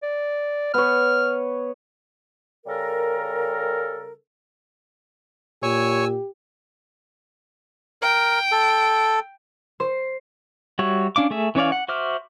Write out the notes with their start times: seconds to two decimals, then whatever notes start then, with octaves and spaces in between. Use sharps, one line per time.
0.03 D5
0.74 B3 C#5 F6
2.67 C#3 G3 A4 A#4
5.63 A#2 G4 C#5 G#5 E6
8.02 A#4 G5
8.52 A4
9.80 C5
10.79 G3 F#4 C#5 E5
11.16 C#4 D4 F5 D6
11.31 A3 G#4 E5
11.55 E3 C#4 C#5 D5 F5
11.72 F#5
11.88 F#4 C5 E5 D6 F6